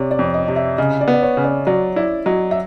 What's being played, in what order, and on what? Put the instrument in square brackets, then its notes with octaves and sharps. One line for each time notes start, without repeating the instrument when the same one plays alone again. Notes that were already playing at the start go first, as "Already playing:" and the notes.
Already playing: [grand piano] C3 [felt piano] C#5 D5
[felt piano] D5
[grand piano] F2
[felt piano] D#5
[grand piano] C3
[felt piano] E5
[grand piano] C#3 [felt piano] D#5
[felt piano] D5
[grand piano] B3
[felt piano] D5
C#5
[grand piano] C#3
[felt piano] D5
[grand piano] F#3 [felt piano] D5
[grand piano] E4 [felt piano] D5
[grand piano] F#3 [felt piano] D#5
[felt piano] E5